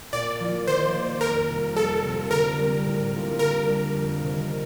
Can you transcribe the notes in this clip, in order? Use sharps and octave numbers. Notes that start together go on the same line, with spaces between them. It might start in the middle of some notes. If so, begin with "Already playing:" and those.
A#2 D5
F3 A#3 F4
D#3 C5
A#3 D#4
F2 A#4
C3 G3
F2 A4
C3 F3 C4
D3 A#4
G3 C4
A2
G3 A#3 D4 F4
D3 A#4
G3 D4
F2
C3 D#3